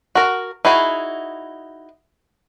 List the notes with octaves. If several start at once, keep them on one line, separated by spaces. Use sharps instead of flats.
F#4 A#4
D#4 E4 F#4 G#4